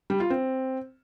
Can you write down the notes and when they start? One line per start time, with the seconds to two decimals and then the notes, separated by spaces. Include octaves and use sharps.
0.10 G3
0.20 F4
0.30 C4